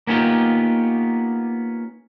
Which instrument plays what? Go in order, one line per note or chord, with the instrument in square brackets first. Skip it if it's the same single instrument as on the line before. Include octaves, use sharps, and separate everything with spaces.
[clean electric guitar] A#3 B3 C#4 D#4 F4 G4